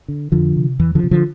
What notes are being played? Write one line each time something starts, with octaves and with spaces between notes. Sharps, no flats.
D3
F2 D3 F3
C3
E2 E3
D3 F3
C3
D3 F3